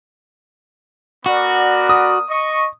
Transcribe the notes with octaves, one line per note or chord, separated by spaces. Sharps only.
B3 F#4 A#4 D5
D#6
D#5 C#6